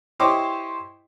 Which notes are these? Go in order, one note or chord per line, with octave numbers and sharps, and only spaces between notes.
E4 G4 C5 C#5 D#5 D6